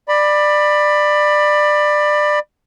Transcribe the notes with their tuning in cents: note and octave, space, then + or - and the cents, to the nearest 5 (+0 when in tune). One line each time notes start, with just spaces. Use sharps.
D5 +20 B5 +0